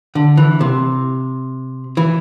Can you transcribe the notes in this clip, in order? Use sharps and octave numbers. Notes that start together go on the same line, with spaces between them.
D3
E3
C3
E3